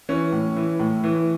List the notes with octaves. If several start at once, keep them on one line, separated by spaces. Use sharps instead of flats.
E3 C#4
A2
E3
A2
E3